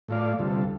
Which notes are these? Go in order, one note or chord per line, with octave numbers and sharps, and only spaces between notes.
A2 A3 F4 D5 F5
D2 C3 G3 F4 A4